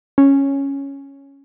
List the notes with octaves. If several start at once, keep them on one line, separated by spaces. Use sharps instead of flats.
C#4